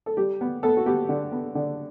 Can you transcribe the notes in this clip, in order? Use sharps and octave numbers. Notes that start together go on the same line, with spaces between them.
A4
G3 G4
B3
B3 A4
F#4
B3 G4
D3
B3
D3